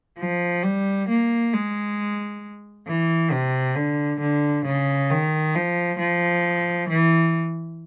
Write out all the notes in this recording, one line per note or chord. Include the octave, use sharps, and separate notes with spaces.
F3
G3
A#3
G#3
E3
C3
D3
D3
C#3
D#3
F3
F3
E3